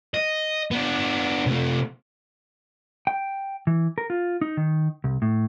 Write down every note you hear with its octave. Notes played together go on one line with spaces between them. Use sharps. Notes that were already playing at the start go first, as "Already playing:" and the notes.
D#5
B3 D4
C3 A3
G5
E3
A#4
F4
D#4
D#3
C2
A2